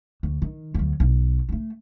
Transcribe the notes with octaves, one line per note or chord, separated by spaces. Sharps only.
D2
D#3
D2 F#3
B1
G#3 A3